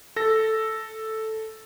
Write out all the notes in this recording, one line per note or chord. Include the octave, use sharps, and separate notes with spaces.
A4 A#6